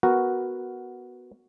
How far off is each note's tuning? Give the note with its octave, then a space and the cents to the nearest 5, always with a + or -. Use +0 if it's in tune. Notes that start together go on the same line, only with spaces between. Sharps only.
B3 +0 F#4 +0 A#4 +0